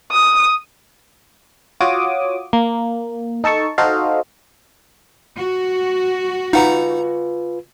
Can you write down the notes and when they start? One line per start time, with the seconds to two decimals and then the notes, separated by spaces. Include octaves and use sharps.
0.12 D#6
1.81 F4 F#4 C#5 D6 D#6
2.53 A#3
3.44 D#4 A4 A5 C#6
3.78 D#4 F#4 A4 C5 D#5 F5
5.38 F#4
6.53 D#4 F4 B4 F#5 A#5